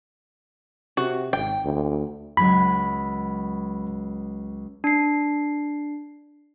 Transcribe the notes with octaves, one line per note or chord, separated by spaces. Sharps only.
C3 F#4
G#1 G5
D2
C#2 F#3 B5 G#6
D4 C7